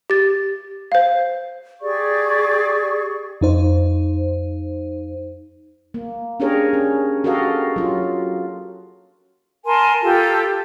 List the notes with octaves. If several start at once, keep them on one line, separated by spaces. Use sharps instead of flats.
G4 A6
C5 F5
G4 G#4 D5 C#6
F2 D#4 C5
A#3
C#4 D4 G4 G#4 A#4 C#5
C#4
F#4 G4 A4 A#4 D#5 F5
F#3 F4
A#4 G#5 A5 C6
F4 G4 A4